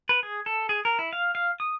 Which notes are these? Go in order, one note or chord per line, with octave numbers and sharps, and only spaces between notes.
B4
G#4
A4
G#4
A#4
E4
F5
F5
D#6